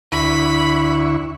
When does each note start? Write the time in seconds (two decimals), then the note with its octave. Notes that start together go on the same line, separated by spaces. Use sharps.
0.12 D2 E4 B5 C#6